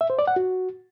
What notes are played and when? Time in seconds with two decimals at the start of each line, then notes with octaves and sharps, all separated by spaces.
0.01 E5
0.10 C5
0.19 D5
0.27 F#5
0.36 F#4